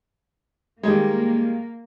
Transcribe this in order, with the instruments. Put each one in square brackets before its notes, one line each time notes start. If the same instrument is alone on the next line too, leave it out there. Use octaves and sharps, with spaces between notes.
[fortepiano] D#3 G3 G#3 [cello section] A#3